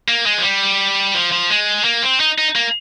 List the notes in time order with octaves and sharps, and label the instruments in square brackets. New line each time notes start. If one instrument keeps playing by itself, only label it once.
[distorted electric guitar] A#3
G#3
F3
G3
F3
F3
G#3
A#3
C4
D#4
D#4
A#3